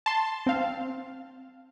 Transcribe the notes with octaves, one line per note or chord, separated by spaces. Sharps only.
A5 C6
C4 F5